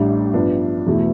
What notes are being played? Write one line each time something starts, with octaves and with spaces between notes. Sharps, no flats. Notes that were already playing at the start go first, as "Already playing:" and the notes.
Already playing: A1 A2 G3 D4
G2 F3 B3 D4
E2 B2 A3 E4